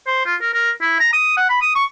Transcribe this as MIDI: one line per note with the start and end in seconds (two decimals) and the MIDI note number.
0.07 0.22 72
0.26 0.35 65
0.41 0.50 70
0.54 0.71 70
0.81 0.96 64
1.00 1.10 82
1.13 1.36 87
1.37 1.48 78
1.49 1.60 83
1.62 1.73 87
1.75 1.85 85